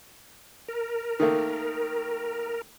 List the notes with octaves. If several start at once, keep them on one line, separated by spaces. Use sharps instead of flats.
A#4
D#3 A3 A#3